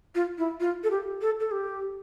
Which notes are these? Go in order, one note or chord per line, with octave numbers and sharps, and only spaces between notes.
F4
E4
F4
A4
G4
A4
A4
G4